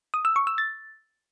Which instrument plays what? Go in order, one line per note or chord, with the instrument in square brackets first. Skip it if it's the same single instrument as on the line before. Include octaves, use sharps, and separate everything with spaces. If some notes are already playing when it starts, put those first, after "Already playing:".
[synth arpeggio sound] D#6
E6
C#6
E6
A6